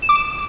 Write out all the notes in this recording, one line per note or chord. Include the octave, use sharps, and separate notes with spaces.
E7
D6
E7